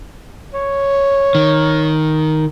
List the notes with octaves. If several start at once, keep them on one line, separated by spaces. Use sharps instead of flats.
C#5
D#3